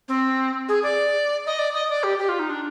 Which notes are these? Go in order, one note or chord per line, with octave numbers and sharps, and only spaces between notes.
C4
G#4
D5
D#5
D5
D#5
D5
G4
G4
F4
D#4
D4